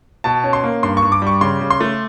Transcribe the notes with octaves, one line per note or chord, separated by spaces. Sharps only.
B2 A5
C#4
C6
A#3
G2 C6
C#6
G2
D6
G3 C#6
C#3 C6
C#3
C6
A3